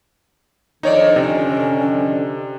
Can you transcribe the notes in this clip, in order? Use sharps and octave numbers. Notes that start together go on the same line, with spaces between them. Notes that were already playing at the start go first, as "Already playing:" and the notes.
F2 D3 D#3 D#4 C#5 D5
C3 C#4